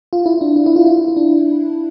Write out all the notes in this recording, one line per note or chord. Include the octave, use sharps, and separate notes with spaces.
F4
E4
D4
E4
E4
F4
E4
E4
D4